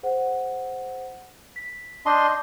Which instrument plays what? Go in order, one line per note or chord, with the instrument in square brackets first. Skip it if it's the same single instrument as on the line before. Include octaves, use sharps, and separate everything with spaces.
[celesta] G#4 C5 F#5
B6
[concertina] D4 D#5 C6 [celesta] A5 G6